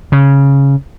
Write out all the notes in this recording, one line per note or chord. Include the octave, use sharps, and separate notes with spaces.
C#3